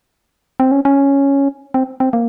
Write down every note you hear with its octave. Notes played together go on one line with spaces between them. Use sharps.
C4
C#4
C#4
C4
C4
A#3